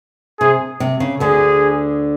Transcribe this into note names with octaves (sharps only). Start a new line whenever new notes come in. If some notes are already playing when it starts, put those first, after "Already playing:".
C3 G#4
C3
C#3
D2 D3 G#4